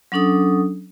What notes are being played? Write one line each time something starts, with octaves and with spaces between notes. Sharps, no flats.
F#3 C#4 D4 A4 D#6